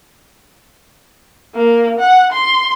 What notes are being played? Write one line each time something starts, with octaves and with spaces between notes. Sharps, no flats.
A#3
F#5
C6